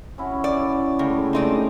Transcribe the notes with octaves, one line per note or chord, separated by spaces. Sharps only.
C#4 E4 F#4
D5
C#3 G#3 A3 G4
A3 C4 D#4 D5